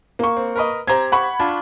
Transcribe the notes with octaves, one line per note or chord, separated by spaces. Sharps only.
A#3 C#6
C4
A#4 B4 D#5
C4 G4 C5 A#5 G#6
F#5 B5 C#6
D4 F4 A5